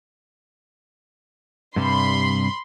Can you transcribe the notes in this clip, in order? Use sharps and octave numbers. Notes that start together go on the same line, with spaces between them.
G2 C3 G3 B5 C6